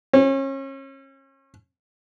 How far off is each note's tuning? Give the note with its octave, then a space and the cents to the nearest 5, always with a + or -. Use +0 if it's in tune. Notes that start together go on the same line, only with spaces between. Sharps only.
C#4 -35